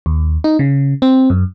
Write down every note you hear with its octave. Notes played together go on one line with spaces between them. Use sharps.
D#2
D#4
C#3
C4
F#2